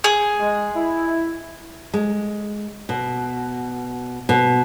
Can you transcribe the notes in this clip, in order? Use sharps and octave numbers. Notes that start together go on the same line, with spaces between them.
G#4
G#3
E4
G#3
B2
B2